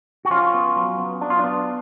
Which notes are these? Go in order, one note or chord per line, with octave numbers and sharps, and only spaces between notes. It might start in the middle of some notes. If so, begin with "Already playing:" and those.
F#4
F3 C#4 F4
B3
F#3
B3
F#3 D4
F4
B3 D4